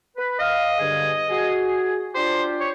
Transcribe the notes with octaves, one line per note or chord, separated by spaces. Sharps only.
B4
D#5 F5
G2 D3 G#4
F#4 G#4
D4 F4 G4 C5
C#5